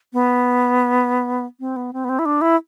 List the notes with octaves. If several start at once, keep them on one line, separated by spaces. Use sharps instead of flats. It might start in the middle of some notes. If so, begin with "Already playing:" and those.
B3
C4
B3
C4
B3
C4
E4
D4
E4